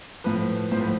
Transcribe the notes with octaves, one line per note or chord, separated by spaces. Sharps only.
A2 F3 B4
A2 F3 C5
B4